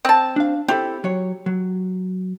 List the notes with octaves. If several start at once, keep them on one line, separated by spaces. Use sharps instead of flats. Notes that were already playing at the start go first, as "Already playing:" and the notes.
C4 A5
D4 F5
C4 E4 G4 A4
F#3 C#5
F#3